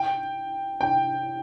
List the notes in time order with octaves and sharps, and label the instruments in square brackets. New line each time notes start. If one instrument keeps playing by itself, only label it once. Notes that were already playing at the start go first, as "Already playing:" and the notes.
Already playing: [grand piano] G5
G5